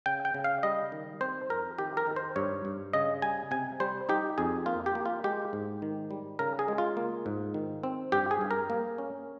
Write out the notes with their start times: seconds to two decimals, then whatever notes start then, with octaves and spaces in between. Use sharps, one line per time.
0.06 C#3 G5
0.25 G5
0.34 C#3
0.44 F5
0.63 G3 D#5
0.92 D#3
1.21 C4 C5
1.50 F2 A#4
1.78 D#3 G4
1.97 A#4
2.07 D#3
2.16 C5
2.36 G2 C#5
2.65 G2
2.93 C#3 D#5
3.22 G3 G#5
3.51 C3 G#5
3.80 G3 C5
4.09 D#4 G4
4.38 F2 G#4
4.66 A#3 F4
4.86 G4
4.95 A#3
5.06 F4
5.24 G#3 G4
5.53 G#2
5.82 D#3
6.11 G3
6.39 C#3 A#4
6.59 G#4
6.68 G#3
6.78 F4
6.97 A#3
7.26 G#2
7.54 D#3
7.84 C4
8.12 G2 G4
8.31 G#4
8.41 G2
8.51 A#4
8.70 A#3
8.98 C#4